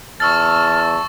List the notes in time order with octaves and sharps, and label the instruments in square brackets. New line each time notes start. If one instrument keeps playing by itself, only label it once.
[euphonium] E2 [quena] A5 [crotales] C#6 E6 A6 [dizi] F6